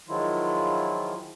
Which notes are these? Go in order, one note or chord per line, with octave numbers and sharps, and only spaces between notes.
D#3 F3 F#3 G#3 E4 F4